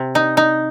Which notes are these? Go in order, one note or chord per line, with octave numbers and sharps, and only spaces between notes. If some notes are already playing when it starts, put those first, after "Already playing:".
Already playing: C3
D#4
D#4